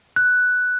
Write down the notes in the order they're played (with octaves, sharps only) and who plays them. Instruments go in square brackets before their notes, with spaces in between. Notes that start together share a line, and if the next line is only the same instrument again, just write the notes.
[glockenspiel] F#6